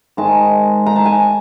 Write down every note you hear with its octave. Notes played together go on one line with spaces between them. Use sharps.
G#2 D#3 G#3 A5
A#5
A5
G#5